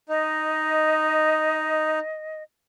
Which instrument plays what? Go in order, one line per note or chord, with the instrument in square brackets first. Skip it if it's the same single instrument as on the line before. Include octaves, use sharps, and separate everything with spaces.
[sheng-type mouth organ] D#4 [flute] D#5